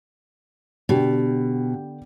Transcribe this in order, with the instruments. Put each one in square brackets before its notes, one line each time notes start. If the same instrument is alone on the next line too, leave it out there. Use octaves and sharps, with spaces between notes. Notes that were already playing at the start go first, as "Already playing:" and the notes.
[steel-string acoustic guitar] B2 [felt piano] D3 G4 G5